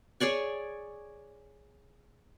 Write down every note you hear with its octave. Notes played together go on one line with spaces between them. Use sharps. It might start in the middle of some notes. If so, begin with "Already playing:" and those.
G#4 C#5 D5 G#5